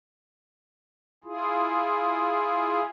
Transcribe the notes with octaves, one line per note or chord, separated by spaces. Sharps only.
E4 F4 G#4